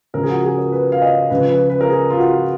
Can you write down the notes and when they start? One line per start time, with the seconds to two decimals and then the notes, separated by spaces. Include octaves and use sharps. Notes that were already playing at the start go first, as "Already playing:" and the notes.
0.14 C#2 C#3 F3 A#4
0.23 G#4
0.29 F#4
0.44 G#4
0.58 A#4
0.72 B4
0.92 F5
1.02 D#5
1.30 C#2 C#3 F3 B4
1.50 B4
1.70 B4
1.81 A#4
1.89 G#4
2.10 F4
2.18 F#4